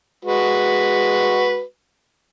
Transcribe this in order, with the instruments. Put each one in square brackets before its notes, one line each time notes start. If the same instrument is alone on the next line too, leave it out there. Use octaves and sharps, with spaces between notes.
[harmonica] G#3 F#4 B4